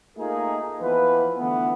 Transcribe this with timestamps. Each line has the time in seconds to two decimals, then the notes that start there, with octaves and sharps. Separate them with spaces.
0.17 A3 A#3 D#4 F4 G#4 A#4
0.82 E3 F3 B3 B4
1.38 D3 E3 A3 B3